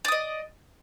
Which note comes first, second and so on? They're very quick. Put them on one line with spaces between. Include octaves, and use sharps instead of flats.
D5 D#6 D#5